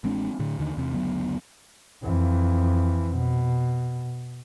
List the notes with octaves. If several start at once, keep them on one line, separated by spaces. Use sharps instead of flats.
A1 G#3 C4 D4
A2 D3
D#2 D3 D#3
E2 C3
F#1 D2 F#3 B3
F2 E3
B2